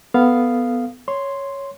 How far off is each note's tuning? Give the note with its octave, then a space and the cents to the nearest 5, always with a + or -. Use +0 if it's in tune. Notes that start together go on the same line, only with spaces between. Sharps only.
B3 +0 A4 +0 F5 +0
C#5 +0 C6 +0